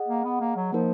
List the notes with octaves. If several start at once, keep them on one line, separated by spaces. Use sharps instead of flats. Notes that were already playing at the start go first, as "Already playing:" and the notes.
Already playing: G#4 D#5 F#5
A#3
B3
A#3
F#3
F3 A#3 D#4 A#4 D#5